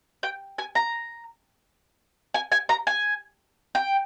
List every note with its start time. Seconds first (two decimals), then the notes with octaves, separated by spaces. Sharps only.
0.23 G5
0.58 G#5
0.75 A#5
2.34 G#5
2.52 G#5
2.69 A#5
2.87 G#5
3.75 G5